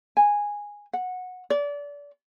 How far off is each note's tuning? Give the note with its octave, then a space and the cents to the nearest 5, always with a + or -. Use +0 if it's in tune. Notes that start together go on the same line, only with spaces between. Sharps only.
G#5 -10
F#5 -15
D5 -30